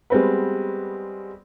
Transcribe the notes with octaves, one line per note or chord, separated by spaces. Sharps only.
G3 G#3 B3 C4 F#4 B4